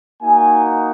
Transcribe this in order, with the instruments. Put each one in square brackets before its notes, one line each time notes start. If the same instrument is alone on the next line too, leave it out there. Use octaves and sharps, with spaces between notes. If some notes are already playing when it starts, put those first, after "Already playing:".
[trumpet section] A#3 D#4 F#4 G#5